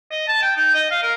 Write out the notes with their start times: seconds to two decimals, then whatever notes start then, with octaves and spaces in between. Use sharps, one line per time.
0.11 D#5
0.28 A5
0.42 G5
0.56 D#4
0.74 D#5
0.91 F5
1.03 A#4